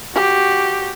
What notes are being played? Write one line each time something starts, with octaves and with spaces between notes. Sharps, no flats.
F#4 G4